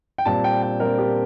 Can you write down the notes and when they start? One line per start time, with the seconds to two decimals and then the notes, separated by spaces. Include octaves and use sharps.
0.18 G5
0.25 A#2 G3 C4 A5
0.44 G5
0.62 G5
0.80 A#2 G3 C4 A#4
0.98 G4